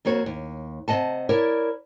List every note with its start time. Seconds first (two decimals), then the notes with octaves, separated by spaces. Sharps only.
0.05 F2 A#3 F#4 C#5
0.26 D#2
0.88 C3 F#3 D#5 F#5 A5
1.29 E4 A#4 C#5 D5